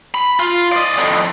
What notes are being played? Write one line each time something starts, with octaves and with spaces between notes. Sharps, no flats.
B5
F4
D5 D#5
F2 A2